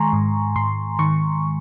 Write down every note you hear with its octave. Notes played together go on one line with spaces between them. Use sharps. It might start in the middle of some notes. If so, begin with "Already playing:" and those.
Already playing: D#3 G#3 G#5 A#5 C6 C#6
G#2
G#2 C6
D#3 C#6